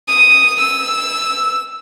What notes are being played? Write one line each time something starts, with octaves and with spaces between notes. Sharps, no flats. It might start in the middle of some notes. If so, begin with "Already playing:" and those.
D#6
E6